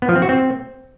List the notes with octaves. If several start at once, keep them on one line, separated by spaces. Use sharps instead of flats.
B3
F3
C4
F#4
C4